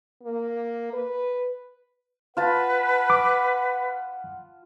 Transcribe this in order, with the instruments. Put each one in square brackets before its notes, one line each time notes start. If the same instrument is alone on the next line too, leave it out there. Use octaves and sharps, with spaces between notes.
[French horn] A#3
B4
[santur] F4 A5 B5 [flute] B4 [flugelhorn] F#5
[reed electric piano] D6